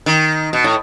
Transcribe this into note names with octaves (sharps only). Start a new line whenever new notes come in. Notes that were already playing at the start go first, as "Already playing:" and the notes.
D#3
B2
A2